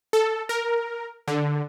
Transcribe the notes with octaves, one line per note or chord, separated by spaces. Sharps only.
A4
A#4
D3